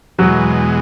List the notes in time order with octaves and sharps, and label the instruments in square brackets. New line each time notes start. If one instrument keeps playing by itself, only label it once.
[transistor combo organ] E2 B2 G#3 [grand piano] F#3